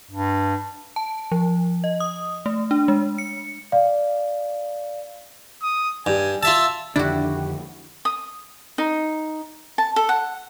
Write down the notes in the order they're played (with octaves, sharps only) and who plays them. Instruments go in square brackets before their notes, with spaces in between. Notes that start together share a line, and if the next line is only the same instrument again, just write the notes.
[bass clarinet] G2
[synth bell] A5
F3
D#5
D#6
A3
D4
G#3
C#7
[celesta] D5 F5
[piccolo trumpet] D#6
[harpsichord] G2 [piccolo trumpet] G#5
[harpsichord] F4 E5 A5 [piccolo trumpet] E6
[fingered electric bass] F2 D3 D#3 [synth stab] D4 [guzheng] E4 F#4 [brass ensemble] G4
[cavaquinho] D#6
D#4
A5
A4
F#5